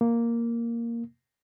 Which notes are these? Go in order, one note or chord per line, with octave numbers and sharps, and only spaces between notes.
A#3